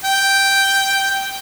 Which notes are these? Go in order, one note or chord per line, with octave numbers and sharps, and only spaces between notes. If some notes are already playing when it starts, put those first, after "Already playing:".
G5